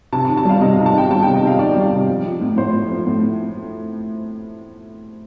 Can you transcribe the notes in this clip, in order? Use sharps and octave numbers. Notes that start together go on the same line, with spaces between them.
C3 A5
A5
D#3
A5
G3 F5
C3 D#5
C3 F5
A5
D#3 G5
G3 A5
C3 G5
D#5
C3 F5
D#3 D5
G3
C3
F3
F3
A2
A2 C5
F3
F3
A2